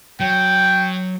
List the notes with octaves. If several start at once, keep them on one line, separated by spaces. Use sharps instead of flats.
F#3 G5